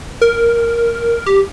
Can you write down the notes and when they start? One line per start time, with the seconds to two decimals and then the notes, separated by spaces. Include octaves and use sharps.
0.22 A#4
1.26 G4